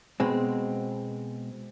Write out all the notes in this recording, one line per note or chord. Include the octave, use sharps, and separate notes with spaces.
B2 G#3 C4